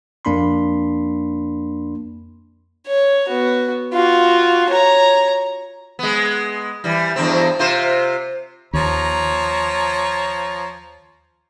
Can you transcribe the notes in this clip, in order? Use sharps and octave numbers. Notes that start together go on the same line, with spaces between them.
F2 A#3 D4 B5 C6
C#5
B3 F#4
F4 F#4
C#5 A#5
G#3 B3
E3 G3
E2 G2 C4
C3 F4 C5
D#2 F3 C#5 A#5